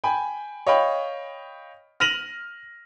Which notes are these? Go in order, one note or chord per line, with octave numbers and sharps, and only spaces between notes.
G5 G#5 B5
C#5 D#5 F5 G5 B5
F6 A#6 D#7 F7 F#7